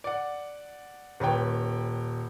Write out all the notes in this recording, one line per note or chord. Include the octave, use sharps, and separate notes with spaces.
D5 F#5
D#1 B4 C#5 G5